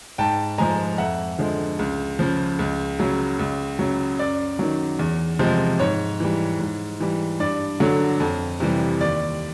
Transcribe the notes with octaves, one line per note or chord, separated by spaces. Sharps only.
G#2 G5 A5
F3 G#3 G#5 A#5
F2 E5 F#5
D3 F3 G#3
C#2
C#3 F3
C#2
C#3 F#3
C#2
C#3 F#3
F#2 D5
D#3 F#3
E2
C3 F3 G#3
G#2 C#5
E3 G3
G#2
E3 G3
G2 D5
D3 F#3
F2
C3 E3 G3
D#2 D5